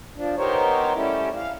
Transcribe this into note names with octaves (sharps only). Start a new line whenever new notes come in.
F3 D4
B3 D#4 G4 A#4 C5 C#5
G3 A3 C#4 E4 G4
F5